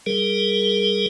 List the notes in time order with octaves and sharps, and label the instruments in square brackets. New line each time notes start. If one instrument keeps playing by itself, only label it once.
[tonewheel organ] G3 G#4 A#4